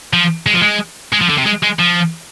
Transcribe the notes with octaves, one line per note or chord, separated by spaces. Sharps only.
F3
G#3
F3
G#3
G#3
F3
D3
C3
G#3
G#3
F3